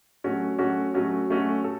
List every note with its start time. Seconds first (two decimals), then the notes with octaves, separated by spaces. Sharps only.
0.24 F#3 A3 C#4 F#4
0.59 F#3 A3 C#4 F#4
0.94 F#3 A3 C#4 F#4
1.30 F#3 A3 C#4 F#4
1.64 A4